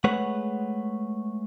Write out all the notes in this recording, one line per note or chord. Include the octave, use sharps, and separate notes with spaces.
G#3 A3 G#4 B4 C#5 F#5